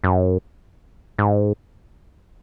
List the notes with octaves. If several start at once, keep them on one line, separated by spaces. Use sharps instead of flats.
F#2
G#2